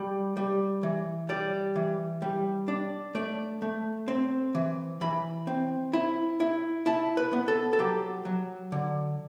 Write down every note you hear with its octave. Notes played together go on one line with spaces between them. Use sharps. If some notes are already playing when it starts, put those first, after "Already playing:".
Already playing: G3
G3
E3
G3 D5
E3
G3
D4
A3 D5
A3
C4
E3
E3 B5
C4
E4
E4
E4 A5
B4
B3
A4
A4
F#3 G4
F#3
D3